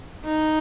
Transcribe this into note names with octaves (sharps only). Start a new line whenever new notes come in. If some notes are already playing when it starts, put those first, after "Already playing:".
D#4